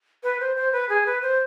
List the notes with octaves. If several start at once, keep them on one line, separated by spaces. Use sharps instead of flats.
B4
C5
C5
B4
G#4
B4
C5